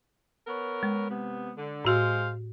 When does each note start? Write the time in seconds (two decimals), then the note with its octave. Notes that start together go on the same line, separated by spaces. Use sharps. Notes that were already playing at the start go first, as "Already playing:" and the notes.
0.47 B3 A#4 C#5
0.83 G#3
1.09 C3 B3
1.57 D3
1.85 A2 G#3 F#4 C5 F5